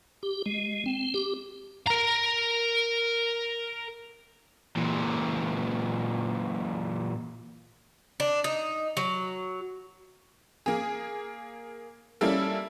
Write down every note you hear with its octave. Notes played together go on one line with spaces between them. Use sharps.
G4
G#3
C4
G4
A#4 A#5
A#2 E3
D4
D#4
F#3
A#3 G#4
G3 A#3 C#4 E4 A4